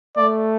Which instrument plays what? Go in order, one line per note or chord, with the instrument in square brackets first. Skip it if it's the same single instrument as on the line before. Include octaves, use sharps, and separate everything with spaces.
[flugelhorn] A3 [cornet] D5